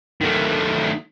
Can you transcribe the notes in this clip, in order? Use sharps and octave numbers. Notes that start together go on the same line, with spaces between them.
D#3 A3